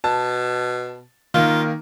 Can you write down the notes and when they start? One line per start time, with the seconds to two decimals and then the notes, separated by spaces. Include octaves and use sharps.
0.04 B2 A5
1.34 D#3 A#3 F4